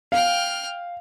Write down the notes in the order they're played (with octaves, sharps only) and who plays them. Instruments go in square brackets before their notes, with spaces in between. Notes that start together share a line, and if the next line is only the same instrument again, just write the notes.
[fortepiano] F5 [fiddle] G5 F6